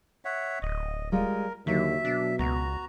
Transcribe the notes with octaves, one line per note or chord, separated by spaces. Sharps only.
C#5 E5 F#5
D1 D#5
G3 G#3 F4 A#4
D#2 D3 F#3 E5
B2 D4
C#2 B3 F#4 A#5